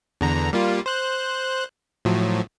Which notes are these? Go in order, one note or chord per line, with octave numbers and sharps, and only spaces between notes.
E2 D3 A#5
G3 A#3 F4
C5 F#6
A2 F3 F#3